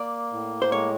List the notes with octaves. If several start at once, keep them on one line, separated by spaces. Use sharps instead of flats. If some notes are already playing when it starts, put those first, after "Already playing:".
Already playing: A#3 D5
A2
C5
G#3 C#5